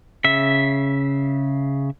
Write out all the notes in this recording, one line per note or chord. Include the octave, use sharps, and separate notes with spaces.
C#3 E5